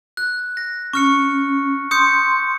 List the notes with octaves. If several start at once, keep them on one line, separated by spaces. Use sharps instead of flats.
F#6
A#6
C#4 C#6 F6 C#7
C6 D#6 G6 C#7